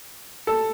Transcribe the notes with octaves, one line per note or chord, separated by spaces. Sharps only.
A4